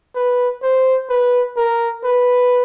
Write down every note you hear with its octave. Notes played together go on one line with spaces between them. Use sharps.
B4
C5
B4
A#4
B4